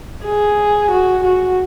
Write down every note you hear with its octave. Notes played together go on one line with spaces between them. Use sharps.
G#4
F#4
F#4